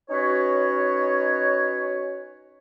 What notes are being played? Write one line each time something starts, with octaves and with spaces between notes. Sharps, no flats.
C#4 D#4 F#4 B4 C#5